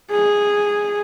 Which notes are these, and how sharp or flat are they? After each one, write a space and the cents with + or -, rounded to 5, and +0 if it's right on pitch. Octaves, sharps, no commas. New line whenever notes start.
G#4 -10